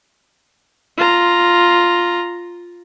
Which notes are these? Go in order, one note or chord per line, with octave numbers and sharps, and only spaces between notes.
F4 A#5